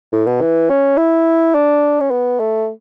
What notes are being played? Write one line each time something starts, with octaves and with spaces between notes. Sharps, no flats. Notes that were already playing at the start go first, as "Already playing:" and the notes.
A2
B2
E3
C#4
E4
D4
C#4
B3
A3